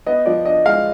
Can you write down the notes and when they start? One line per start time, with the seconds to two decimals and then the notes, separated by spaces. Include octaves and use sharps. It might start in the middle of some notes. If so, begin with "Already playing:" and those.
0.06 B3 D#5
0.26 F3 D5
0.45 D4 D#5
0.66 G#3 F5